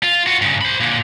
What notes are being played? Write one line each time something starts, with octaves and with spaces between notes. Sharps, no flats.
F4
F4 F#4
G2 C#3
C5 B5
A#2 D3